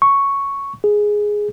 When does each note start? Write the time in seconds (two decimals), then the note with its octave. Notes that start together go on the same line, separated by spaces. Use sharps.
0.02 C#6
0.84 G#4